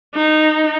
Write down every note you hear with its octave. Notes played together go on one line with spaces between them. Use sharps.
D#4